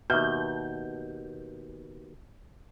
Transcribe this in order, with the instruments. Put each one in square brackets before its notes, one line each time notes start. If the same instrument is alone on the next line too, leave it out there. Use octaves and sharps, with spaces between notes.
[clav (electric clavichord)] D#2 B2 [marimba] E5 F#5 F6 [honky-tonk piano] G6